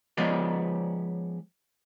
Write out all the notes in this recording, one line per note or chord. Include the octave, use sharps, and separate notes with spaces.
F3 G#3 B3 C#4 D5 D#5